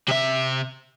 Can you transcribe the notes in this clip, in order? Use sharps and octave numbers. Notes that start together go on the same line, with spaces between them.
C3 E5